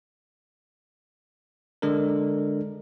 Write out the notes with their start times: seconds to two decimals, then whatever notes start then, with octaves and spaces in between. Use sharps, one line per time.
1.82 D3 G#3 D4 A4 A#4